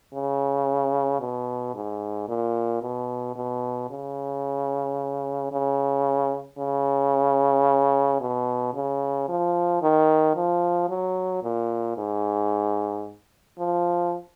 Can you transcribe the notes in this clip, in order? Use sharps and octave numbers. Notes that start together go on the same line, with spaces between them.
C#3
B2
G#2
A#2
B2
B2
C#3
C#3
C#3
B2
C#3
F3
D#3
F3
F#3
A#2
G#2
F3